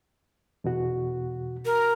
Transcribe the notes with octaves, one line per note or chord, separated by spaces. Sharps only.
E2 B2 F#4
A#4